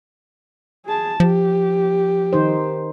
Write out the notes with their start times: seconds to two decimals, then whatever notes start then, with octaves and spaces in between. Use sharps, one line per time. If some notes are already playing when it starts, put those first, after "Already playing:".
0.86 G#4 A5
1.20 F3 G4
2.33 D#3 D#4 C5